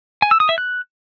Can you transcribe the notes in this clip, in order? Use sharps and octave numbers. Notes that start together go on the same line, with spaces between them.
G#5
E6
D#6
E5
F#6